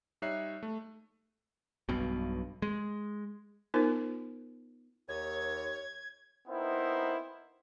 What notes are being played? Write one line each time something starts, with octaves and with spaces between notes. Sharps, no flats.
G3 D#4 C#5 E5 F#6 C7
A3
B1 G2 B2
G#3
B3 D#4 F4 A#4 C5
D#2 C#5 G#6
B3 C4 D#4 E4 A#4 C5